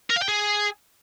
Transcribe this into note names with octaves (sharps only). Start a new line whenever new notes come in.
A#4
F5
G5
G#4